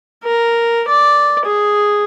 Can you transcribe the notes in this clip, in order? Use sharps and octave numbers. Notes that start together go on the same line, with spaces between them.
A#4
D5
G#4